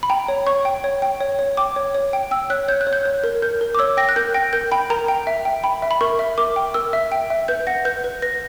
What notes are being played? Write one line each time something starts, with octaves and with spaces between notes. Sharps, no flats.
B5
G5 A#5
C#5
C#5 C#6
G5
C#5
G5
C#5
C#5
G5 D6
C#5
C#5
G5
G5 E6
C#5 F#6
C#5 G6
F#6
C#5
G6
C#5
A#4
A#4 G6
A#4
D6
C#5 E6
G5 A#6
F#6
A#4 G6
G5 A#6
A#4 G6
G5 B5
A#4 A#5
G5
E5
G5
G5 B5
E5
B5
A#4 C#6
E5
A#4 D6
G5
A#4 E6
E5
G5
E5
B4 G6
F#5 A#6
B4 G6
B4
B4 A#6